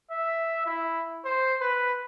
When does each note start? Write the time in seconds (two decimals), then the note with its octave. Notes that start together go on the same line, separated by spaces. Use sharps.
0.11 E5
0.66 E4
1.25 C5
1.61 B4